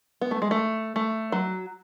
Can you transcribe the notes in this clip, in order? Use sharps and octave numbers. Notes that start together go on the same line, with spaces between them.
B3
A3
G#3
A3
A3
F#3